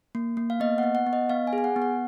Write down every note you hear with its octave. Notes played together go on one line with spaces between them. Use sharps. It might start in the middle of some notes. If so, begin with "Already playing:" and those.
A#3
A#3
F5
B3 D#5
F#5
B3
F#5
B3
D#5
B3 F5
G#5
G#4
G#5
F#5
B3
F#5